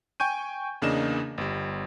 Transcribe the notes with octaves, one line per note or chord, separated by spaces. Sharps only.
G5 G#5 C#6 G6 D#7
E2 C#3 A#3 D4 D#5 E7
G1 G3